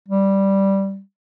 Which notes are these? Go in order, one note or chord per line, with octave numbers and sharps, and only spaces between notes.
G3